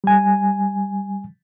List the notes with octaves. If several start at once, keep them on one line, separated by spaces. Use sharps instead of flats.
G3 G#5